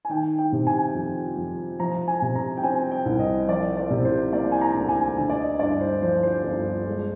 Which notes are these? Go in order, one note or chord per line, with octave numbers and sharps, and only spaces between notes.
G#5
D#3 G5
G5
C3
G#5
F2
F2
F3 A#5
G#5
C3
A#5
G5
C4 G#5
G5
C2
D#5
F3 D5
D5
C3
C5
A#3 D5
G#5
A#5
D2
G#5
D3 G#5
D5
D#5
G2 D5
C5
F3 C5
C5
G1
G#3